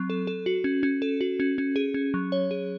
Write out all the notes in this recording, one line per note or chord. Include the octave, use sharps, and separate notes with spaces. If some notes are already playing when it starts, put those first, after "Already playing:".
Already playing: F#3 C4
A4
A4
F#4
C#4
C#4
A4
F#4
C#4
C#4
G#4
C#4
F#3
C#5
G#4